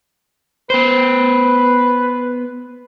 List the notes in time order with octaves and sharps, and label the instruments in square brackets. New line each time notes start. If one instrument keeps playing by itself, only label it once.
[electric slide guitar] B3 C5 [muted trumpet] B4